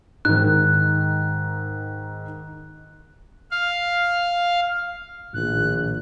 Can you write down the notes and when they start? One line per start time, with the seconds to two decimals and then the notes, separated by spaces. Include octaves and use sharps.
0.25 G#2 D#3 F#6
3.51 F5
5.34 A#1 A2 D#3 F#6